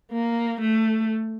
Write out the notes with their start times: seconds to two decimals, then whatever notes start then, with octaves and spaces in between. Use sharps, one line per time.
0.12 A#3
0.61 A3